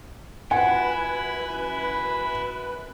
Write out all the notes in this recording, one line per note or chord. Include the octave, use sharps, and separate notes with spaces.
F#2 E4 F4 B4 F#5 G#5